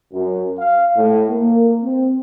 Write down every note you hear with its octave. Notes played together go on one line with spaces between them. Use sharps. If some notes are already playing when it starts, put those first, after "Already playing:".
F#2
F5
A2
A#3
C4